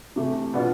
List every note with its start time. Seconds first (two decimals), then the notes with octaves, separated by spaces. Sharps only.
0.16 C3 E3 A3 E4 G4
0.53 B2 B3 D4 F4